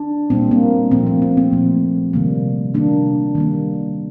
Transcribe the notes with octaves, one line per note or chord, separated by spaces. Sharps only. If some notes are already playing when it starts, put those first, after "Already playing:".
Already playing: D4
A#2 G3 A#3 C4
A#3
A#2 F3 A3 C4
A#3
C4
C4
A#2 F3 A3
C3 D#3 G3 A#3
C3 D#3 G3 A#3 D4
D#3 G3 A#3